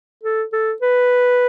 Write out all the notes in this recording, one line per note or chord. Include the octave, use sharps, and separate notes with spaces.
A4
A4
B4